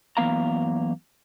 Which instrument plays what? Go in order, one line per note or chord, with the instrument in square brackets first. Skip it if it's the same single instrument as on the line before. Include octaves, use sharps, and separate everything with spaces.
[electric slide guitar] F#2 E3 A#3 B3 F5 A#5